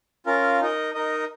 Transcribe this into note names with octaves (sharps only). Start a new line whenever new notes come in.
C#4 F4 A#4 F5
D#4 A#4 D#5
D#4 A#4 D#5